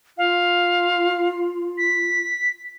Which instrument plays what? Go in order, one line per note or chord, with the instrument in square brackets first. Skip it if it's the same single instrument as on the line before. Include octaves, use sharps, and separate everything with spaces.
[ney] F4 [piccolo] F5
[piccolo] B6